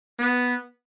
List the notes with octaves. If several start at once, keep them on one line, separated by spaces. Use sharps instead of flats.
B3